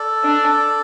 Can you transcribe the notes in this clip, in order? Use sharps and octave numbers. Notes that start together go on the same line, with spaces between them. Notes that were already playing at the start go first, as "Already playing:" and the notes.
Already playing: A4 D5
D4